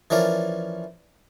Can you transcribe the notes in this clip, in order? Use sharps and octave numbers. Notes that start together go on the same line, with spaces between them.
E3 F3 C#4 A#4 D5